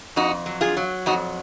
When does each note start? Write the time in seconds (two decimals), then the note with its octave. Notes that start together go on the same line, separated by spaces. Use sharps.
0.16 F2 D#4 F#4
0.46 F#3
0.61 F4 G#4
0.77 F#3
1.06 F2 D#4 F#4